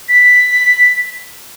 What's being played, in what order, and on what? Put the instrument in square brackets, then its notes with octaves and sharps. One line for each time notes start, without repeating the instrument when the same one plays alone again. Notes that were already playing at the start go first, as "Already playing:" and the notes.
[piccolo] B6